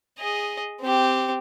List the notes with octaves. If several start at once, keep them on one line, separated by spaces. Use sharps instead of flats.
G#4 D#5
C4 G4